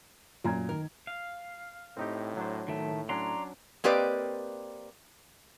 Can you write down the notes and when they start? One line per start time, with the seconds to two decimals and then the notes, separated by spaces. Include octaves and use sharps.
0.44 F#2 A#2 A#5 G#6
0.69 D#3 A#4
1.07 F5
1.97 A2 C4 D#4 G4
2.37 F#3 D4 C5
2.68 A2 D#3 A3
3.09 F#3 C#4 D4 D5 A#5 C6
3.84 A#3 C4 G4 B4 D5 D#5